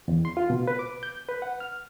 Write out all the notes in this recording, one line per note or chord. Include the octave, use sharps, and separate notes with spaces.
E2
C6
F4
B2
B4
D6
G6
B4
F#5
F6